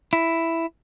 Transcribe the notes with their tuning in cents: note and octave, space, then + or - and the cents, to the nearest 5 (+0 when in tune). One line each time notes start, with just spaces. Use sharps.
E4 +5